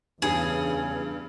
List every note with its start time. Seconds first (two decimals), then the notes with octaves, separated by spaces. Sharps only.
0.22 E2 G2 C#3 G#4